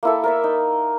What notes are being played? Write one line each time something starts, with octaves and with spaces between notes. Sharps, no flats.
A#3 E4 A4
A#4 D5 E5
D#4